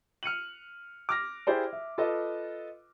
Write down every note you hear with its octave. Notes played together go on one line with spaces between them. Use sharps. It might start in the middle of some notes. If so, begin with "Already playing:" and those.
F6 C#7 D#7 F#7
D6 F6 A#6
E4 G4 G#4 C5 D5
E5
F4 A4 B4 D#5